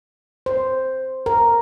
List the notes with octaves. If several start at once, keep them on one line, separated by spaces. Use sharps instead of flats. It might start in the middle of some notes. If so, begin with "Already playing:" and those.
C5
A#4